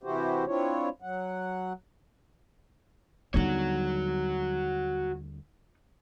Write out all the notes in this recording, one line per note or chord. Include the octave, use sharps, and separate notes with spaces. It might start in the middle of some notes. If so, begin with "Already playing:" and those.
C3 E3 E4 F#4 G4 C5
C4 D4 E4 F4 C#5
F#3 F#5
D#2 D3 G3 B3 D#4 F#4 C#5